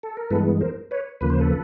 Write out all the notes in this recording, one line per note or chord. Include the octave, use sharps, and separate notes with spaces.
A4
A#4
G2 E3 G#3 B3 A4 B4
A#4 C5
B4 C#5
D#2 C#3 F3 A#3 B4
C5
A4 B4